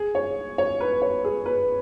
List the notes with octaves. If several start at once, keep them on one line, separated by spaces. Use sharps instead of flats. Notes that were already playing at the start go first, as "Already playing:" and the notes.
Already playing: G#4
C#5
C#5
B4
C#5
G#4
B4